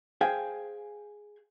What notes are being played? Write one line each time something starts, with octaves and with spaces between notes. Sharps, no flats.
G#4 C5 F5 G5 G#5